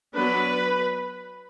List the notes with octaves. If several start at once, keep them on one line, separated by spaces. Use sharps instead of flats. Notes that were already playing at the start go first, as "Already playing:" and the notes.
F#3 B3 D4 B4